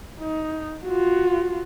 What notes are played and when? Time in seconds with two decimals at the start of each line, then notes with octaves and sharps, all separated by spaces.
0.20 D#4
0.84 F4 F#4